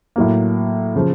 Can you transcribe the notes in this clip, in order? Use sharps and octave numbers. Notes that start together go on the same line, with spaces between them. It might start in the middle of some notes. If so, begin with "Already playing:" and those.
A2 F#3 A#3
C#3 F3